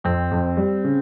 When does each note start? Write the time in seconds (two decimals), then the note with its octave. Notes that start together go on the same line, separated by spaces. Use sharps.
0.04 F2 C4
0.31 F2
0.57 G3
0.84 C#3